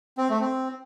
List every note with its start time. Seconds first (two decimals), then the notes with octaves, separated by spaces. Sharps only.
0.18 C4
0.30 A3
0.41 C4